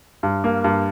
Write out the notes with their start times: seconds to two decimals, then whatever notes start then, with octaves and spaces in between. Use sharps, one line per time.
0.23 G2
0.44 A#3
0.64 G2